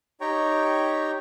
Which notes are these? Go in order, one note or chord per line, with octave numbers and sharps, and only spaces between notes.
D#4 G4 C#5 G5 A#5 C#6